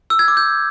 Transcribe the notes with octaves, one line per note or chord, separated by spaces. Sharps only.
E6
G#6
D6
G6